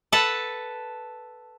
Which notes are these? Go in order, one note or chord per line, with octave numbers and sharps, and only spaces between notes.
A4 B4 F#5 A5